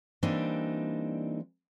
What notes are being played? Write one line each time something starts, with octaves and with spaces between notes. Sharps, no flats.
E3 G3 A#3 C4 D4 D#4